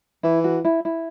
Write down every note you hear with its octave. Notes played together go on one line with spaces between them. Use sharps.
E3 E4
F#4
E4
E4